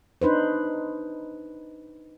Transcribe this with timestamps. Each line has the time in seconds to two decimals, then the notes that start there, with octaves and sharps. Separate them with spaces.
0.22 D4 D#4 B4 C5